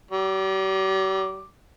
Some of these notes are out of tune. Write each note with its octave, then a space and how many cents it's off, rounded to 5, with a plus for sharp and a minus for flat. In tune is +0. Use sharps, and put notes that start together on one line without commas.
G3 -45 D6 +0